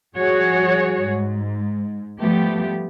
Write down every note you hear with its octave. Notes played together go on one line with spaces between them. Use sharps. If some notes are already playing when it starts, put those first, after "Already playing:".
F3 G3 F#4 G#4 C#5
G#2
F3 G3 A3 B3 G4